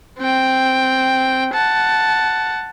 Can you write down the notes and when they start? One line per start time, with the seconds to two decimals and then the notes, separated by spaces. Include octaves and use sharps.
0.19 C4 G5
1.54 F#5 A5